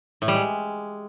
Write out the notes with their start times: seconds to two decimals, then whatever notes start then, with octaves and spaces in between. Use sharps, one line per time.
0.22 A2
0.28 G3
0.34 G#3